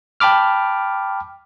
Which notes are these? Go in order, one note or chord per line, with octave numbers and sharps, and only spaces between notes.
G5 A5 B5 D6 F6